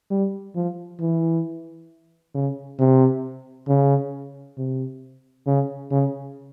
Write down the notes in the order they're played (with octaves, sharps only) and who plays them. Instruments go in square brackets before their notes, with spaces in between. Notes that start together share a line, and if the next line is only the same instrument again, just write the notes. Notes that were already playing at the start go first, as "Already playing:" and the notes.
[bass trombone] G3
F3
E3
C#3
C3
C#3
C3
C#3
C#3